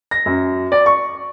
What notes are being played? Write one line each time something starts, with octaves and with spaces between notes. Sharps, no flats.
A#6
F#2
D5
C#6